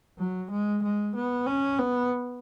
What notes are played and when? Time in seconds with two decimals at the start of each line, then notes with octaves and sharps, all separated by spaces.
0.18 F#3
0.50 G#3
0.82 G#3
1.15 B3
1.47 C#4
1.79 B3